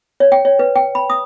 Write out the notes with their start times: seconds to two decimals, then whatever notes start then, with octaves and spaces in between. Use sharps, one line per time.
0.20 C#5
0.32 G5
0.45 C#5
0.59 B4
0.76 G5
0.95 B5
1.10 D#6